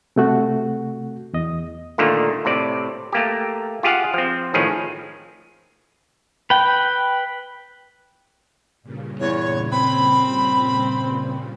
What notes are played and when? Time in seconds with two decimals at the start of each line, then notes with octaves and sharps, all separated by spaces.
0.16 C3 A3 F#4
1.33 E2 D#5
1.98 A#2 D3 D#3 A3 A#3
2.45 A2 C3 D5
3.13 A3 A#3 G4
3.83 F4 G4 G#4 F5 F#5
4.14 F3 C4
4.54 A2 D#3 F3 C#4 G#4
6.50 B4 G5
8.83 G2 A#2 C#3
9.20 E2 C#5
9.72 C4 B5